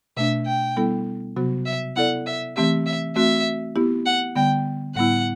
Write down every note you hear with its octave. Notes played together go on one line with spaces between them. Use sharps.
B2 A3 D4 E5
G5
G3 B3 E4 A4
C3 F#3 B3 F#4
E5
B3 E4 A4 D5 F#5
E5
E3 A3 C4 G4 E5
E5
A3 C4 F#4 E5
B3 E4 G4
F#5
D3 G3 B3 G5
A2 G3 B3 E4 F#5